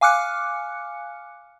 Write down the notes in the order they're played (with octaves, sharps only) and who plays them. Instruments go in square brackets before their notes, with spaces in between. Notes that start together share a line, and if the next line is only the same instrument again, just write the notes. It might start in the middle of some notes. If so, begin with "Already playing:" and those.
[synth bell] F5 G#5 D6 F6 F#6 C#7